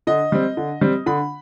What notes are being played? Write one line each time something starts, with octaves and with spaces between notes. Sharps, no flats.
D3 D#5
G3 C4
D3
G3 C4
D3 B5